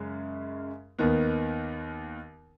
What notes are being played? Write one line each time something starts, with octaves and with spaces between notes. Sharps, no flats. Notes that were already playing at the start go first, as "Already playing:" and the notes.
Already playing: F#2 C#3 G#3 C#4
D#2 D#3 B3